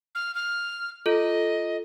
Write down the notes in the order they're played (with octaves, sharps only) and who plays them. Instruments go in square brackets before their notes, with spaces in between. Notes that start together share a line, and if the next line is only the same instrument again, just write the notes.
[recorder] F6
F6
[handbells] F4 A4 [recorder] D#5